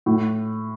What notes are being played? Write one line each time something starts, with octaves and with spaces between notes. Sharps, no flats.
A2